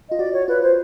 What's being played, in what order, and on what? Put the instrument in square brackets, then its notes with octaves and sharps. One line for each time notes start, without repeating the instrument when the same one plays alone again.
[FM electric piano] F4 [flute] D#5
[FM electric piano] F#4 [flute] D5
[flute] C#5
[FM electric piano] F4 [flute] B4
[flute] C5